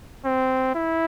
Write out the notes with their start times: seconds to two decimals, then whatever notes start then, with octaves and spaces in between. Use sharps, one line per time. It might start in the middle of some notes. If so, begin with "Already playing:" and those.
0.25 C4
0.75 E4